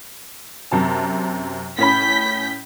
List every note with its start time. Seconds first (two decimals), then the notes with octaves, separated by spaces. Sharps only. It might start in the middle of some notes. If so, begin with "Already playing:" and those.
0.71 F#2 C3 A5
1.79 A2 C#4 B5 G6 B6